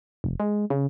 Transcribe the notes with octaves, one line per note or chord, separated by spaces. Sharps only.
F1
G#3
C#3